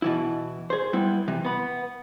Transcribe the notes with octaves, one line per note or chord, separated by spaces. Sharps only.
B2 E3 E4
G#4 C5
G3 B3 E4
C3 E3
B3 B5